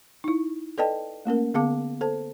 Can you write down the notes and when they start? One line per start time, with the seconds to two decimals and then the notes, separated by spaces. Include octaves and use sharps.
0.24 D#4 E4
0.78 A4 B4 D5 D#5 G5 A5
1.25 A3 A#3 C#4 A#4
1.54 D3 B3 G#4 F5 A5 D6
2.01 A4 C5 A5